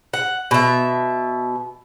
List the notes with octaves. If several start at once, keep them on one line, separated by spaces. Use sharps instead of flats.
F#5
B2 E5